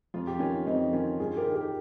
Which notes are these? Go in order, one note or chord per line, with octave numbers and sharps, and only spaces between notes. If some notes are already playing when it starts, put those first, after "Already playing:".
F2 F4
G4
D#3 C#4 F4
F2 C4 D#4
D#3 C#4 F4
G2 F4 G#4
G4 A#4
D#3
G4 A#4